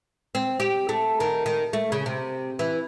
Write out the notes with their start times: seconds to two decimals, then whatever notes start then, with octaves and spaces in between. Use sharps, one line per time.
0.35 C4
0.60 G4
0.89 A3
1.20 D#3
1.46 D#3
1.73 A3
1.92 C#3
2.06 C3
2.59 E3